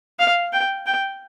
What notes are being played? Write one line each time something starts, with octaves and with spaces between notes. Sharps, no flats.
F5
G5
G5